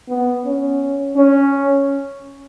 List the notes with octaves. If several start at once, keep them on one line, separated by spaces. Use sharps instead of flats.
B3
C#4
C#4